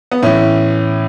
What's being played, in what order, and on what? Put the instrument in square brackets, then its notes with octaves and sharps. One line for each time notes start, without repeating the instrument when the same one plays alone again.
[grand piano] B3
A2 E3 C#4